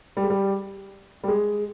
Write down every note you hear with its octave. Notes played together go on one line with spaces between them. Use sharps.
G3
G#3
G3
G3
G#3